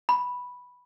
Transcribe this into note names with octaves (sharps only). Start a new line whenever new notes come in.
B5